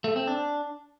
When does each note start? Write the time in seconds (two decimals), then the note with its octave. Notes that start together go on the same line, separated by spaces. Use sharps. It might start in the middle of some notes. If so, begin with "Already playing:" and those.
0.04 A3
0.16 C4
0.27 D4